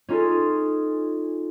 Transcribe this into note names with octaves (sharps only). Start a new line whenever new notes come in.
C#4 D#4 F4 G#4 A4